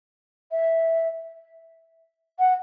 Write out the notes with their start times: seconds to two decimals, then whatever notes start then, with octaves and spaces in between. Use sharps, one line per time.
0.51 E5
2.39 F#5